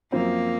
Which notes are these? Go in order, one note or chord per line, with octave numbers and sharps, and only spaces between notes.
F#2 F3 A#3 C4